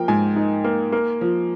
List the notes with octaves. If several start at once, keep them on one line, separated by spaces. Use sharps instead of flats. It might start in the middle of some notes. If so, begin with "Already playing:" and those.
Already playing: F3 A#3 A#4 G5
G#2 G#5
D#4
A#3
A#3
F3